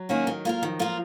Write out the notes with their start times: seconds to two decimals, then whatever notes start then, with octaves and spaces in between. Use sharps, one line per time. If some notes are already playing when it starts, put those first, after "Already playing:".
Already playing: F#3
0.09 D#3 A#3 C#4 F#4
0.27 D#3
0.45 A#3 F4 A#4
0.62 D#3 F3
0.79 A#3 F4 A#4